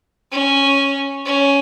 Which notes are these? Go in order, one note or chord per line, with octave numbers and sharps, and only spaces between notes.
C#4
C#4